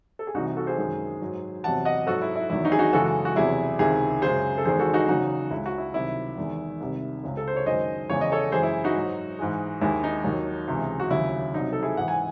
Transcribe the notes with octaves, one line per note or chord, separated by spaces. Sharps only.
A4
G#4
C2 C3 E3 D#4 F#4
F#4 A4
G#4 C5
F#2 D#3 G#3
G#2 F#3
E2 C3 F#3 F#5 A5
D#5 F#5
G#2 F#3 F#4 A4
E4
E4
E2 D#3 F#3 E4
D#4 F#4
G#4
D#4 F#4
F#2 C#3 E3 G#3 F#4 A4
F#4
E2 C3 F#3 E4 G#4
C#2 C3 D#3 E4 G#4
F#2 C#3 G#3 G#4 C5
A4
E2 D#3 G#3 G#4 C5
F#4 A4
D#4 F#4
E2 C#3 F#3 D#4 F#4
C#2 C#3 G#3 E4
F#4
E4
C2 C3 D#3 F#3 E4
E2 D#3 G#3
C2 C3 D#3
C#2 C#3 G#3
A4
C5
C#5
F#2 D#3 G#3 C5 D#5
E2 C#3 E3 G#3 C#5
D#5
A4 C#5
F#2 E3 G#3 G#4 C5
E4
D#4 F#4
G#2 F#3
G#2 E3 G#3
D#2 D#3 G#3 E4
D#4
D#2 D#3 F#3
C#2 C3 E3 G#3
F#4
D#2 C#3 F#3 E4
C2 C3 F#3 D#4
A4
E4 G#4
G#2 E3 G#3 F#5
G#5